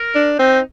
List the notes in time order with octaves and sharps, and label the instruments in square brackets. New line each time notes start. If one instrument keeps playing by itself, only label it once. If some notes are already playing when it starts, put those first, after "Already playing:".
Already playing: [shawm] A#4
[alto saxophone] D4
[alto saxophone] C4 [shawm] D#4